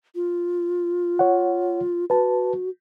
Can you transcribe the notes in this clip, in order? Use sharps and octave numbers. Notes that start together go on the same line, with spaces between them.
F4
C#5 F#5
F#4 B4 A5